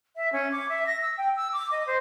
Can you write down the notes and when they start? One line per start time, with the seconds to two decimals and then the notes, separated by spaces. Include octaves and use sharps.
0.16 E5
0.32 C#4
0.51 D6
0.69 E5
0.86 A#6
1.01 E6
1.17 G5
1.35 E6
1.52 D6
1.71 D#5
1.86 C5